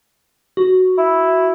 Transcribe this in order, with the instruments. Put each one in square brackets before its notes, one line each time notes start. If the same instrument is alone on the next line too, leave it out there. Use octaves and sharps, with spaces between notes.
[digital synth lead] F#4
[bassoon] E4